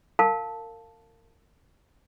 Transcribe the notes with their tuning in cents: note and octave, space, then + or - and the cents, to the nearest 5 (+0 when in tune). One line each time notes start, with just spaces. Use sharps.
A#4 -35 F5 +0 A5 +0